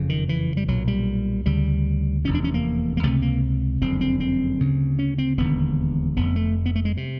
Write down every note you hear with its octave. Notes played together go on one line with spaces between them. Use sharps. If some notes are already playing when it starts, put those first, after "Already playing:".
Already playing: F#1 F2 C#3
D#3
E3
G3
B1 A#2 F#3
G3
D2 C#3 G3
F1 E2 C3 C#4
D4
C#4
A#3
A#3
C#2 C3 A3
A#3
F#1 F2 D3 C4
C4
C4
D2 C#3
C#4
C4
E1 D#2 D3 B3
F1 F2 C#3 B3
A3
B3
A3
G#3
C3